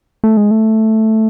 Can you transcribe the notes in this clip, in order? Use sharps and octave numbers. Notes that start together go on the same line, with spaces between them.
A3
G#3
A3